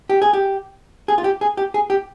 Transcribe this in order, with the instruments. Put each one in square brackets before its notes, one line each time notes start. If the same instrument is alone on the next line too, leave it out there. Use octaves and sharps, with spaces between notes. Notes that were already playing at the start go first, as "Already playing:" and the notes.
[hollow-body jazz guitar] G4
G#4
G4
G#4
F4
G4
G#4
G4
G#4
G4